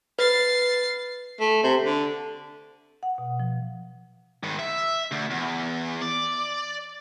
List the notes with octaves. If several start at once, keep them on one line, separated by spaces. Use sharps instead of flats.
B4 A6 C7
A3
C3
D3
F#5
B2
F3
G#2 D#3
E5
D2
E2
D5